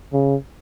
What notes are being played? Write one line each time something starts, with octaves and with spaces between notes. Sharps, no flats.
C#3